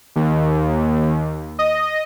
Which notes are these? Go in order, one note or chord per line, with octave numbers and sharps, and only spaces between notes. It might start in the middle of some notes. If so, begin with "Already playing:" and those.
D#2
D#5